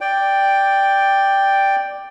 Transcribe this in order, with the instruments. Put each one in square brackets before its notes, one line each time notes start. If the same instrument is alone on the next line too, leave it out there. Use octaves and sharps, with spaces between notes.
[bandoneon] D5 G5